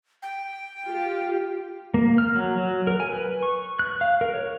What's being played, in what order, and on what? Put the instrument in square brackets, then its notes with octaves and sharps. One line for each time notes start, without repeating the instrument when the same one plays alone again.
[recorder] G5
[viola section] F4 G4
[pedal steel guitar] A#3
F6
F#3
F#3
A#4
G#5
B4
C#6
F#6
F5
A#4
C#5